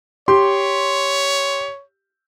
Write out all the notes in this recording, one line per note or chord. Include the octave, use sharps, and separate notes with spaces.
G4 C#5 C6